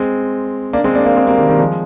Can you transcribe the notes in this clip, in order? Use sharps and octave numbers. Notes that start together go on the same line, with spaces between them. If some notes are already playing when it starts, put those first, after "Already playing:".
Already playing: G#3 C4
A#3 D4
G#3 C4
A#3 D4
A#3 D4
G#3 C4
G3 A#3
D#3 G3
D#3 G3
F3 G#3